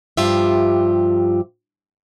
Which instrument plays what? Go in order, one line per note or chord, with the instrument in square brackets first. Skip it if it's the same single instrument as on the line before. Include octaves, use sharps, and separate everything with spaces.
[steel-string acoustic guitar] G2 F3 F4 G4 E5